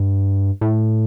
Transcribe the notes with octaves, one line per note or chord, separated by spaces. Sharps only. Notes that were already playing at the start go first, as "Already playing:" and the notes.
Already playing: G2
A2